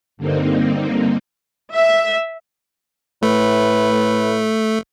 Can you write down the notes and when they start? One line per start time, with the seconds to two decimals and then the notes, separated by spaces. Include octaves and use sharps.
0.17 G2 D3 A#3 C4 D#4
1.74 E5
3.23 A2 A3 B4